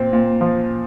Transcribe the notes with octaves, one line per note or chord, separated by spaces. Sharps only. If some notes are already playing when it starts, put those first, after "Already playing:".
Already playing: A#2 C4
A#2
F3